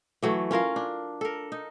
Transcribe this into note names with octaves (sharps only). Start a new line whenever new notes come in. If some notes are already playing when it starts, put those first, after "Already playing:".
E3 F#3 A3
C#4 F4 A#4 F5
D4
A4 A#4
D#4